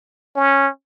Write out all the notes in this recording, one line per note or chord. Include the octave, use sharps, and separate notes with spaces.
C#4